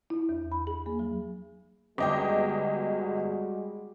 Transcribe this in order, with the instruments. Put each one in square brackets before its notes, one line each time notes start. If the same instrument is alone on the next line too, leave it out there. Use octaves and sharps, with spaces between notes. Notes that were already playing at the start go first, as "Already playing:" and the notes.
[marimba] E4
E2
B5
G#4
A#3
F#3
[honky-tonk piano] G1 D#5 [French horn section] G3 G#3 F#4 [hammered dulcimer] G5 D6